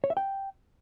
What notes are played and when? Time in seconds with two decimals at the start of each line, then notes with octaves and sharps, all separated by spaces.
0.04 C#5
0.10 E5
0.17 G5